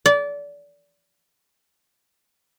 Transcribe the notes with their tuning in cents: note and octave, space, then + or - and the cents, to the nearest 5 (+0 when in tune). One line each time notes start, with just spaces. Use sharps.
D5 -25